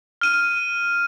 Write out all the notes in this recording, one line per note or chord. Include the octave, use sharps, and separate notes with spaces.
F6 D#7